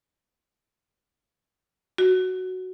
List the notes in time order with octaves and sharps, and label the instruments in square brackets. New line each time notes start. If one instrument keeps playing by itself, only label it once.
[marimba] F#4